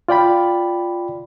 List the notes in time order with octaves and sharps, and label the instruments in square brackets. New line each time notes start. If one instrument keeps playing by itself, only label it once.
[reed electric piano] F4 D5 G5 B5